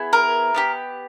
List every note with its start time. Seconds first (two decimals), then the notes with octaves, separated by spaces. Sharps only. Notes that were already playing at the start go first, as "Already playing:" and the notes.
Already playing: B3 E4 G#4
0.13 A#4
0.54 B3 D#4 G4